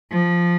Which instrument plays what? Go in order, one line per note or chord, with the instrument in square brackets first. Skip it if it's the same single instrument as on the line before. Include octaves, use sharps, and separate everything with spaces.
[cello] F3